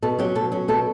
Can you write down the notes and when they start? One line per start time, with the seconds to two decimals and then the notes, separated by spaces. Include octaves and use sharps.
0.02 B2 A4
0.19 F#3 C#4 G4
0.35 B2 A4
0.52 F#3 C#4
0.68 B2 A4